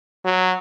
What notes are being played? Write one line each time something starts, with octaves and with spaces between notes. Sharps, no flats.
F#3